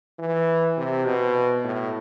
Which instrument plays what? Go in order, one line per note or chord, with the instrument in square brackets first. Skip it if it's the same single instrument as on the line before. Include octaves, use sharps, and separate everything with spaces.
[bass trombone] E3
C3
B2
A2